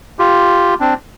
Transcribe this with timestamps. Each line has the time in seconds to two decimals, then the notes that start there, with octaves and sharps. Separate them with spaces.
0.19 F4 G4
0.80 C4 D4